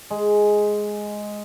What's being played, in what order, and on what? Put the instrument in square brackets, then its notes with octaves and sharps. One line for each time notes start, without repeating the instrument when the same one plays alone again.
[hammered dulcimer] G#3